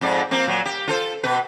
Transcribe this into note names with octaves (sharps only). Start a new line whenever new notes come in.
F2 G#2 D5
F3 A#3 C4
A#2 F#3
G4
F4 A4 C5
B2 B4